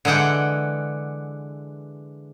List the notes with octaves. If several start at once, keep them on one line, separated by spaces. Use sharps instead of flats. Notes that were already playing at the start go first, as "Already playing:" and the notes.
D3 E3 G#3 F#5 G5